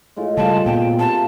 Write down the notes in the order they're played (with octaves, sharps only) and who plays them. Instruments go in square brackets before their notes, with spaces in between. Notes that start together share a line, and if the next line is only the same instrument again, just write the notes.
[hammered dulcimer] A2 G#3 F4
[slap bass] C#3 G3 [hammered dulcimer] G#3 F4 C5 [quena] A5
[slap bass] A#2 B3 [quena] G5
[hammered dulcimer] C3 A#3 [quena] A5